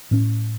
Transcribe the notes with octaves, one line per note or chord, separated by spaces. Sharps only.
A2 F#3 C#4